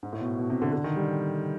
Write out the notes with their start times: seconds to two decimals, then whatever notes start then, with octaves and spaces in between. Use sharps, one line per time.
0.03 G#2
0.13 A2
0.21 B2
0.38 B2
0.50 C3
0.62 D3
0.73 D3
0.84 D#3
0.96 G3